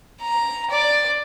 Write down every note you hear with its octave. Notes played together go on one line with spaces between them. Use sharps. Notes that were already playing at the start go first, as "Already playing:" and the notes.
A#5
D5